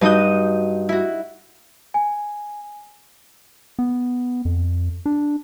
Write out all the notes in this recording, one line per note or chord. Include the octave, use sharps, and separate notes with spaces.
G2 D#4 F#4 D#6 G6
E4 F#4
G#5
B3
F2
D4